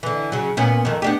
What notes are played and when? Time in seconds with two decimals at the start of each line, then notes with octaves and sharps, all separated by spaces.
0.03 D3 E3
0.32 C#3 F#3
0.57 A#2 B3 C#4
0.85 F2 D#3
1.02 B3 D4 G4